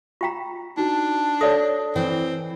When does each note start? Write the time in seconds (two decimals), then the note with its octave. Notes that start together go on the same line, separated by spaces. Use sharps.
0.21 F4 G5 A#5 C#6 B6
0.77 D4 D#4 F#4
1.41 A4 C#5 D5 D#6 A#6
1.96 E3 C4